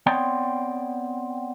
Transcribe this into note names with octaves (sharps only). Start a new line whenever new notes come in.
B3 C4 C#5 D5 G5